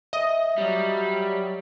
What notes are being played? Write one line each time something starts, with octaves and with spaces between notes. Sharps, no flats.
D#5 E5
F#3 G3